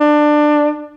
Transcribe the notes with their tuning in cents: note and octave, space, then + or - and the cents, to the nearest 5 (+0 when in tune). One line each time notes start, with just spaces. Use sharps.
D4 +20